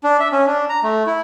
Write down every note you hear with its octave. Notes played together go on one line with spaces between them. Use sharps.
D4
E5
C#4
D4
A#5
A3
E4